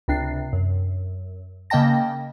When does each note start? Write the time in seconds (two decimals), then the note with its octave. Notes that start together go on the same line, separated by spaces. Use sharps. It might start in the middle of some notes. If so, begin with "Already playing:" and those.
0.08 C#2 C3 D4 C7
0.53 F#2
1.70 C#3 A#3 D#5 G5 A5 A#6